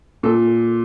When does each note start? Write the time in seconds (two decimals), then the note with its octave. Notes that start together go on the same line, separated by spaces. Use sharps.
0.23 A#2 A4